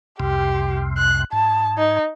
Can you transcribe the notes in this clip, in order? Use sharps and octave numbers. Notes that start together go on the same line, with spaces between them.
C2 F2 C3 G4
F#6
G#2 A5
D#4